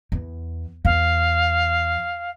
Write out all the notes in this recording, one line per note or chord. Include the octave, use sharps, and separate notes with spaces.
E2
E2 F5